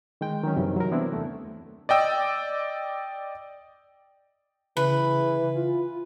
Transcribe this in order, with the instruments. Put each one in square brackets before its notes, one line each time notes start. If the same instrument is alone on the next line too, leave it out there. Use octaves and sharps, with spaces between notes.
[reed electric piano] D#3 G#3 G5
D#3 F#3 C#4
F#2 C3 E3 F#3 G3
F#3 A#4
E3 B3 C4 D4 E4
D#2 A3
[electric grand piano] D5 D#5 G5 E6
[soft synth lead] C#3 [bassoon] E3 [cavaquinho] B4
[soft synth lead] F4